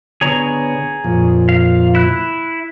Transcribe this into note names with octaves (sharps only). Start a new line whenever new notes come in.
D3 B3 G#4 C#5 A#5
F2 A#2 F3
F5
E4 F#6